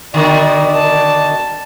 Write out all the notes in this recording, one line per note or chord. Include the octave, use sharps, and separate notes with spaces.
B2 D3 D#3 D5
A5